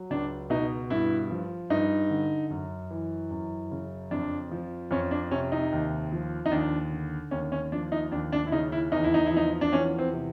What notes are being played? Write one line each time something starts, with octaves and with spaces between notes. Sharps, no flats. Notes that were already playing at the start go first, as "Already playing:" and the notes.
Already playing: F#3
C#2 D4
B2 D#4
G2 E4
F3
G2 D#4
D3
F#2
E3
F#2
C#3
F2 D4
F3
F2 C#4
D4
C3 C#4
D#4
D#2
F3
D#4
D#2 D4
D3
D#2 C#4
C#4
F3 D4
D#4
D#2 D4
D4
E4
C#3 D#4
E4
E2 D#4
E4
D#4
E4
F3 D#4
D4
E2 C#4
C4
C3